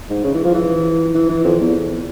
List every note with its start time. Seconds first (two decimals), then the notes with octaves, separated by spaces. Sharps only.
0.10 G#2
0.24 C#3
0.34 E3
0.45 F3
0.54 E3
1.14 E3
1.29 E3
1.44 F2
1.60 E2